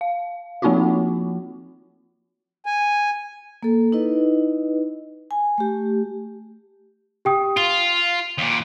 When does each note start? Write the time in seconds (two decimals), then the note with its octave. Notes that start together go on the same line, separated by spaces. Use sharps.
0.01 F5
0.62 F3 A#3 C4 D#4 F4 F#4
2.66 G#5
3.63 A#3 A4
3.92 D#4 E4 B4 D#5
5.31 G#5
5.58 A3 G4
7.25 G4 G5 D#6
7.57 F4 G7
8.38 D#2 A#2